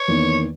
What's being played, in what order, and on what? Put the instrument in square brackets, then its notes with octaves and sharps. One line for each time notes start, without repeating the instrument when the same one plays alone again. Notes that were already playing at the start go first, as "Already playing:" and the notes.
Already playing: [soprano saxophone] C#5
[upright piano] E2 D#3 A#3